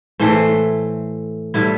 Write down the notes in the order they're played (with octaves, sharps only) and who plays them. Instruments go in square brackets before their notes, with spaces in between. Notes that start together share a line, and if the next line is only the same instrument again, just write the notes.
[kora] A2 E3 A3 C5
A2 G3 B3 E4